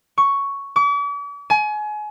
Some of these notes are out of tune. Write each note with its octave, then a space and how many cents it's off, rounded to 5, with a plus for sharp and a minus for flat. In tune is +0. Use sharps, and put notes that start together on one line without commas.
C#6 +5
D6 -45
G#5 +30